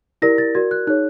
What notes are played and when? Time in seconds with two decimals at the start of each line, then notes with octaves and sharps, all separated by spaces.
0.22 E4 G4 A#4 D5 A#6
0.38 A6
0.55 F#4 A#4 D5 G#6
0.71 F#6
0.87 D#4 G#4 C#5 F#6